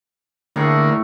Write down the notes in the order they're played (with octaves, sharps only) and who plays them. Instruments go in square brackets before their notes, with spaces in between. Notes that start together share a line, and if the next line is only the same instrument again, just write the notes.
[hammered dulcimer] A2 G#4 C#6 [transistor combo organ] D3 A#3